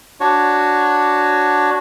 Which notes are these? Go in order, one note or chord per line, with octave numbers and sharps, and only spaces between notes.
D4 F#4 C#5